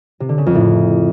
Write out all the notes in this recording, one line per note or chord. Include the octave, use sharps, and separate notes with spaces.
C3
D3
C#3
F2
A2